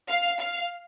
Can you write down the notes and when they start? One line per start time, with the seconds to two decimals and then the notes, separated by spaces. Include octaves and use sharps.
0.09 F5
0.39 F5